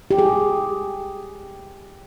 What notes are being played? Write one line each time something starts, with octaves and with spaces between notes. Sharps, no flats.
G4
G#4